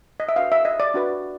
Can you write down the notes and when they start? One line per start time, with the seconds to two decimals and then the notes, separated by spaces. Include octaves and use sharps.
0.20 D#5
0.29 E5
0.36 D4 F#4 B4 F5
0.52 E5
0.65 D#5
0.80 D5
0.94 D4 F#4 B4